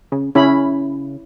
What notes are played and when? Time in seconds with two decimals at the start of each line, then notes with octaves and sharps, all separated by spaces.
0.12 C#3
0.35 C#3 C#4 E4 B5